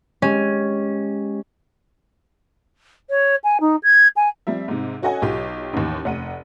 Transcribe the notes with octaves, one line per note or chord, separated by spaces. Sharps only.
G#3 C#4 G4 D#5
C#5
G#5
D#4
G#6
G#5
F3 G3 C4 E5
G#2 C3
C#4 F#4 A4 D#5 F#5 G#5
B1 F4 G4
A1 D#2
F1 F#5 D#7